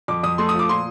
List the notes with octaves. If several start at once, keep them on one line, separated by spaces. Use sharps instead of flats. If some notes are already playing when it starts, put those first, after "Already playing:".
F2 D6
F2 D#6
A3 C6
D#6
F3
D6
A#2 C6